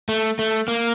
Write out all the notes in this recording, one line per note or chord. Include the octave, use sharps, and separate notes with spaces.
A3
A3
A#3